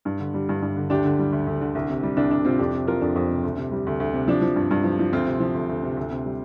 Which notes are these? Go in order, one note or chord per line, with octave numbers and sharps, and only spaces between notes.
G2
D3
G3
G2
G2
D3
D2 D4 G4
D3
G3
D2
D2
D3
C2
C3
G3
C2 D4
C2 D4
C3 C4 F4
F2 D4 G4
C3
F3 F4 A#4
F2 D4
F2
C3
D2
C3
G3
D2
D2
C3
F3 D4
F3
G2
G2
F3
F3
D2 C4 F4
C3
F3
D2
D2
C3
D2
C3
G3